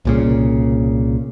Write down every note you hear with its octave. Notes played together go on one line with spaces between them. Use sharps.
C2 A#2 C#3